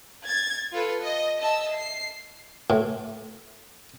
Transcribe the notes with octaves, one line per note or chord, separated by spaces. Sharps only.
G#6 A6
F4 A4 B4
D#5
D#5 E5 A5 E6
C7
A2